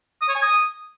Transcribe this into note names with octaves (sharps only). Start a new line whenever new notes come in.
D#6
C#5
G#5
D#6